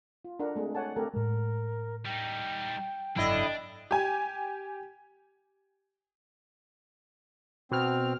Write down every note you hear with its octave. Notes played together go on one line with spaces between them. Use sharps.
F4
D4 A4 A#4 F#5
G#3 A3 C4 G#4
C#5 F#5 G#5 A5
A3 C4 G4 A4 A#4
A2 G#3 A#4
G3 D#4 G5
F#1 G#2 D3 F#3 D4 E4 D#5
G4 G#5
B2 C4 F6